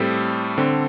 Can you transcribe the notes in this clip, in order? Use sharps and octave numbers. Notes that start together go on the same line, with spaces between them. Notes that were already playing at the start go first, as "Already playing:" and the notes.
Already playing: A2 G3 C4 A4
D3 C4